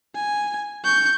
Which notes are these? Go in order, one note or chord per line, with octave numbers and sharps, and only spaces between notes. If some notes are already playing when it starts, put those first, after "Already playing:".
G#5
C#6 G6